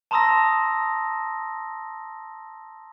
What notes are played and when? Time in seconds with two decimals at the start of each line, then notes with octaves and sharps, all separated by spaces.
0.11 A5 A#5 C6 D#6 E6 A#6